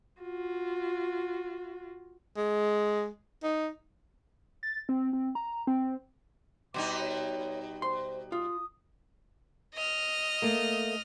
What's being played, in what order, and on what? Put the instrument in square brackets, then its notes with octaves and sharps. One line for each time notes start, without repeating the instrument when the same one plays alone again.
[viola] F4 F#4
[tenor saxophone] G#3
D#4
[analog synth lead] A6
C4
C4
A#5
C4
[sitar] B2 G3 D#4 [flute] D6
[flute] C#5
[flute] C5 [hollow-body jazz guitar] C6
[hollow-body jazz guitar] F4 [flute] D#6
[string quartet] D#5 F6
[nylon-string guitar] A3 A#3